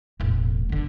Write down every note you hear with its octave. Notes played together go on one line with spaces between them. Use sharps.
E1 A1
G1 D3